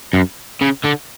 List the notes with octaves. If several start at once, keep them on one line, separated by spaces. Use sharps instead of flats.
F#2
C#3
D3